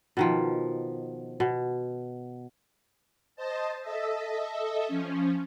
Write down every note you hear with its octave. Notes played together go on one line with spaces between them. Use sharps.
B2 D#3 F3
B2
C5 D#5 A5
A4 D#5 E5
F3 C#4